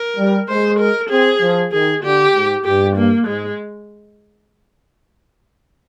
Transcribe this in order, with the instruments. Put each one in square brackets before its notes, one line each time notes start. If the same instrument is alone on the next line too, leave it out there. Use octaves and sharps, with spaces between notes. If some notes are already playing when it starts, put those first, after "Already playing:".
Already playing: [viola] A#4
[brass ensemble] G3
[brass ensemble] G#3 [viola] C5
[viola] A#4
[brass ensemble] C4 [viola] G#4
[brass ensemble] F3
[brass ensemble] D#3 [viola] G#4
[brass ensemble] D3 [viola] G4
[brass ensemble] G#2
[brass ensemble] G2 [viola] G4
[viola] A#3
[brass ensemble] G#2 [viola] G#3